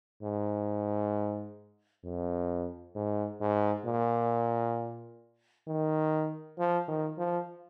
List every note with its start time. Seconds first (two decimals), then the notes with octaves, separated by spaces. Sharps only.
0.23 G#2
2.04 F2
2.95 G#2
3.41 G#2
3.86 A#2
5.68 D#3
6.58 F3
6.88 D#3
7.18 F3